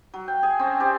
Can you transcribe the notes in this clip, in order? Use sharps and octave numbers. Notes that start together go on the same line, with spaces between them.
F#3
G5
G#4 G#5
C4 C#4
G4 C5 D5